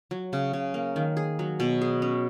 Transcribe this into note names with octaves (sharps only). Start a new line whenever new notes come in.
F#3
C#3
C#3
A#3
D#3
G#4
F#3
B2
G#4
C#4